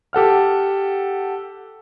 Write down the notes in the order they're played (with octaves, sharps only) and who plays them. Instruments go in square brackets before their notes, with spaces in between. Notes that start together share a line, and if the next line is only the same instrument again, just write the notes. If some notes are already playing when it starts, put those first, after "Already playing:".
[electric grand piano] G4 A4 F#5 F6